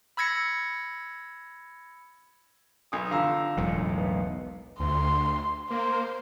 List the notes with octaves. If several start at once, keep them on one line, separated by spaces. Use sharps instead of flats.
B5 E6 G#6 A#6 C#7
B1 G#5 D#6
D3 F3 F5 A#5 E6
E1 B1 A2
B3
D2 C6
A#3 C5